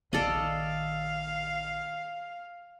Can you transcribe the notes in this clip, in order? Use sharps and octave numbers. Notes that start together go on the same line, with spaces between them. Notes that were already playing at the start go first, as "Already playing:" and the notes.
A#1 D#3 A4 D5 D#5 F5